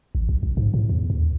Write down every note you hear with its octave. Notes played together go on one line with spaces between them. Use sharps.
A1
B1
B1
G#2
A2
E2
D#2